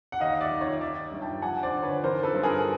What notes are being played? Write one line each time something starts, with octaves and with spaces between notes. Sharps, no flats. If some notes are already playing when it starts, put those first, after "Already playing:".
F#5
D#2 D#5 F5
D5 E5
D#3
C#5 D#5
D#3 D5 E5
G2
G5 A5
F3 F#5 G#5
C5 D5
D3
B4 C#5
E3 A#4 C5
A4 B4
G2
G#4 A#4